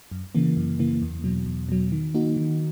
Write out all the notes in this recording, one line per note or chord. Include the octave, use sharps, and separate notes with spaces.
F#2
C#3 E3 A#3
F#2
C#3 E3 A#3
E2
B2 F#3
E2
B2 F#3
D#3
A#3 D#4 F#4
D#3